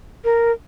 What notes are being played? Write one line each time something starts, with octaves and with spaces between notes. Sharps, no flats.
A#4